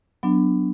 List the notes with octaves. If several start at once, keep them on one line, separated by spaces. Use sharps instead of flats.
F#3 B3 D4